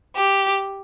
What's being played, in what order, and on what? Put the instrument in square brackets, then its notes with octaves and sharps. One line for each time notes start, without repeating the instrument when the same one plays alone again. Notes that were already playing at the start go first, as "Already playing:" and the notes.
[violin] G4